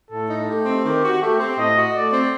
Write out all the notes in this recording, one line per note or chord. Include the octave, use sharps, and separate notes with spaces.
A2 A4
D#4
A3 G4
C4
D#3 G4
F#4
A3 G4
C4
A2 D#5
F#4
A3 D5
C4